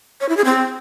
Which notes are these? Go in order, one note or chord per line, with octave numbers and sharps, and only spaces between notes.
C#5
E4
G#4
C4